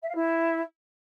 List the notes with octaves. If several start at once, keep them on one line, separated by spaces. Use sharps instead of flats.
E5
F5
E4